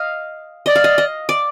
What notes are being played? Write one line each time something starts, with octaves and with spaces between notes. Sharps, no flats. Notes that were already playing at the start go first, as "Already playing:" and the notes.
Already playing: D#5 F5
D5 D#5
F5
D#5
D#5
D5